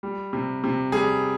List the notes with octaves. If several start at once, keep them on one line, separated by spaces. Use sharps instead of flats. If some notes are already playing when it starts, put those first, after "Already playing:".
G3
C3
C3
G3 G#4